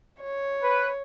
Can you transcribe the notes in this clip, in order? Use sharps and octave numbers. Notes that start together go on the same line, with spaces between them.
C#5
B4